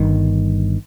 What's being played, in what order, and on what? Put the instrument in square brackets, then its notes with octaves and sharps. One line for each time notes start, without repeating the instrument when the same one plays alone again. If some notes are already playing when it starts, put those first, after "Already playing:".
Already playing: [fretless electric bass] G1 G2 D#3